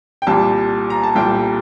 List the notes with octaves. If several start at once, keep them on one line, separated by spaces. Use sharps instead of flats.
G5
C2 A#2 G3 A5
A#5
A5
C2 A#2 G3 G5